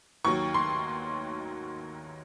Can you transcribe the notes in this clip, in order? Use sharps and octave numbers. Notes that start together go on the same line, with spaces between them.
D#2 D#3 F#3 C#6
C6